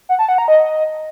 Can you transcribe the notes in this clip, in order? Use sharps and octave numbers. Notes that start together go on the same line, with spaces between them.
F#5
A5
F#5
A#5
D#5